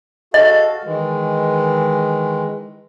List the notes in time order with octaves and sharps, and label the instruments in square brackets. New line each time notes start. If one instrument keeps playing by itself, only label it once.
[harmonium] F#4 A4 F5 [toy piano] D#5
[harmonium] D#3 E3 G#3